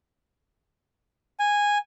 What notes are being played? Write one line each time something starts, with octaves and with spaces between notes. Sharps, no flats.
G#5